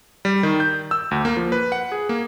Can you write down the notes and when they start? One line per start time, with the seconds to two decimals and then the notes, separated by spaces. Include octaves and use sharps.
0.25 G3
0.43 D#3
0.60 G6
0.91 E6
1.11 D2
1.25 A#3
1.37 F3
1.52 B4
1.72 F#5
1.92 G#4
2.09 A#3